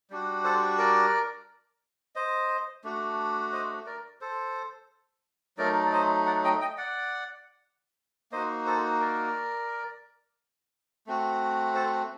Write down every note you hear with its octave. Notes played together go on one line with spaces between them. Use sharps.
G3 D4 F#4
A4 C5
A#4 D5
C5 D#5
A3 D4 F#4
C5 D#5
A#4 D5
A4 C5
F#3 A3 D#4 A#4 D5
D5
C5 D#5
D5 F#5
D#5 G5
D#5 G5
D5 F#5
A#3 D#4 F#4 C5 D#5
A4 C5
A#4 D5
A3 C4 F#4
A4 C5